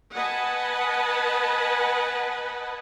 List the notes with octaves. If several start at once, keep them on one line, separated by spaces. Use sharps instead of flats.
B4 D#5 F#5 G#5 A5 B5